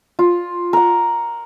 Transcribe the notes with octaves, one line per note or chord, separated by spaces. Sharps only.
F4
A#4 F#5